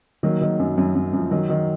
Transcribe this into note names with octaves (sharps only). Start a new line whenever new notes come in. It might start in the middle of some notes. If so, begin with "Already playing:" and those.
D#3 F#3 A#3
D#3
F#2
F#2
F#2
F#2
F3
D#3 F#3
D#3